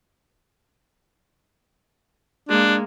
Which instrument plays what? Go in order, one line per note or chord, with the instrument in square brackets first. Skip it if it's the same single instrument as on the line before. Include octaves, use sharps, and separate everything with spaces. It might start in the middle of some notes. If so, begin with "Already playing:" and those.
[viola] G#3 A#3 [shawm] D4